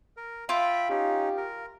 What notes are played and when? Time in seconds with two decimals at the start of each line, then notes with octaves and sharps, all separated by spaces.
0.17 A#4
0.49 F4 E5 G5 B5
0.90 C#4 D#4 G4
1.37 A#4